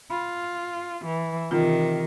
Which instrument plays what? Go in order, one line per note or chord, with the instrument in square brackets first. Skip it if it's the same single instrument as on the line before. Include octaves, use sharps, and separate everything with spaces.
[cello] F4 [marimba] B5
[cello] E3
[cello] C3 D#3 [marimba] E3 F4